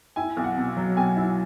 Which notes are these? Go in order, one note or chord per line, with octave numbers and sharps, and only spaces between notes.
E4 G#5
B1
F#5
B2
F#3
B1 G#5
E4